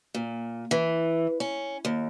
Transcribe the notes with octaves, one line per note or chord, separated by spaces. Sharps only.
A#2
E3
C#4
D#2